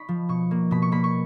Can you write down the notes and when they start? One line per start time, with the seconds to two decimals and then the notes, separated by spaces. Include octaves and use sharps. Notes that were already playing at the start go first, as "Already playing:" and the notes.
Already playing: D#4 B5 C#6
0.08 F3
0.29 B2 C#6
0.51 A#3
0.71 B2 B5
0.82 C#6
0.92 A#3 B5
1.04 C#6